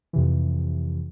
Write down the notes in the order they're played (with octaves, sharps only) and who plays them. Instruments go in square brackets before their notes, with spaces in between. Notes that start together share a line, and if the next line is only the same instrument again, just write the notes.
[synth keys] F2 C3 E3